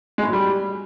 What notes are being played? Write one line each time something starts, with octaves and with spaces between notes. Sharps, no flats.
G#3
A2
F#3
G3